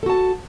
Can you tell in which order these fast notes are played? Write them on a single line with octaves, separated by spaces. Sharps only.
A4 F#4 A5